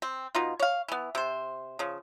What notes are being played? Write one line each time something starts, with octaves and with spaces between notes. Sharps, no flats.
C4
B2 D#4 F4
C#5 F5
E3 B3
C3 C5
C#3 F3